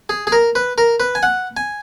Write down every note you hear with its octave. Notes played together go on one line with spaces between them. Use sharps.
G#4
G#4
A#4
B4
A#4
B4
G#5
F#5
G#5